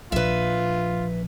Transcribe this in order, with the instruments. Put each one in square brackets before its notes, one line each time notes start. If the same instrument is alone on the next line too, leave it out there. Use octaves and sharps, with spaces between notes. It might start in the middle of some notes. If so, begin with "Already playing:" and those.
[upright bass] A#1 F3 [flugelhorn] F4 [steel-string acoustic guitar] B4 E5